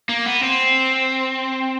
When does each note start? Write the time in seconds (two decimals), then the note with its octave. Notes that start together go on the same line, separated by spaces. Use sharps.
0.09 A#3
0.26 B3
0.43 C4